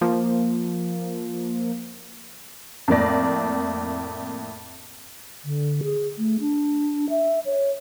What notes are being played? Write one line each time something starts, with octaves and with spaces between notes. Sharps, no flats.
F3 A#3
F2 A2 A#3 D5 A#6
D3
G#4
A3
D4
E5
C#5